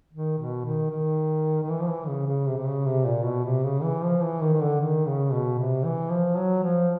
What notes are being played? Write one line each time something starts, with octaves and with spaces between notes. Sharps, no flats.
D#3
B2
D#3
D#3
D#3
E3
F3
E3
C#3
C#3
C3
C3
C#3
C3
A#2
B2
C3
C#3
E3
F3
E3
D#3
D#3
D3
D#3
C#3
B2
C3
E3
F3
F#3
F3